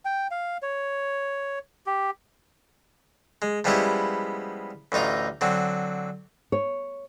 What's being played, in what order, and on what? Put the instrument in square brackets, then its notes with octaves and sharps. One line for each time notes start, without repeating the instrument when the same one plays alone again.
[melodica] G5
F5
C#5
G4
[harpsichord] G#3
F3 G3 G#3 B3 C#4 E4
A1 D2 D#4 F4 A#5
D3 F#3 C4
[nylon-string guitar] C#5